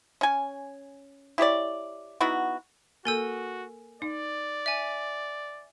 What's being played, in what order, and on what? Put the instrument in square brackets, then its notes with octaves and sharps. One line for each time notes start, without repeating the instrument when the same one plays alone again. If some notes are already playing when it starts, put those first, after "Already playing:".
[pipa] C#4 G#5
E4 G4 C#5 D5
B3 D#4 E4 F#4
[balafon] A#3 A4 [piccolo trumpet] F#4 [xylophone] A#4 G#5 E6
[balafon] D#4 [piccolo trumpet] D5
[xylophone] E5 G#5